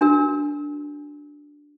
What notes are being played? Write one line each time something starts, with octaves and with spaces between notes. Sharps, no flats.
D4 F#4 A#4 E6